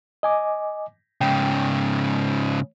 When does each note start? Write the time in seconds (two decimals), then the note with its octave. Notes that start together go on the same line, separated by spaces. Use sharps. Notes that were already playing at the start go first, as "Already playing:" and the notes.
0.23 D#5 G#5 D6
1.21 G#2 C#3 G5